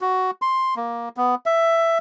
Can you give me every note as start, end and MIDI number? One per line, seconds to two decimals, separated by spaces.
0.01 0.31 66
0.42 0.75 84
0.76 1.09 58
1.17 1.35 59
1.46 1.98 76